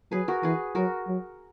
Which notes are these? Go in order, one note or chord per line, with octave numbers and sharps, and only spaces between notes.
F#3 G#4 B4
F#4 A#4
E3 G#4 B4
F#3 F#4 A#4
F#3